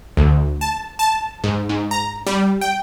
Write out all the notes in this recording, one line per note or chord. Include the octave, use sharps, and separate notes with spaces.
D2
A5
A5
G#2
G#2
A#5
G3
G5